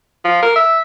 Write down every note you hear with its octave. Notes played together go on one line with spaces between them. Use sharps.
F3
A#4
E5